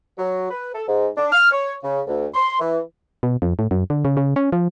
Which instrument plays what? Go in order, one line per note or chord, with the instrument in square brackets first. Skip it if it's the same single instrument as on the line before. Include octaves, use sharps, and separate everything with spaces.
[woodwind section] F#3
B4
A4
G#2
D4
F6
C#5
C#3
D2
C6
E3
[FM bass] B2
F2
A2
F#2
D3
C#3
C#3
C#4
F3